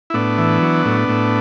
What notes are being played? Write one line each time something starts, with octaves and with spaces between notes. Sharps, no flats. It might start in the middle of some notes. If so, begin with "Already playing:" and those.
E4
A2 B3 D4
E3
F#3
A2
A2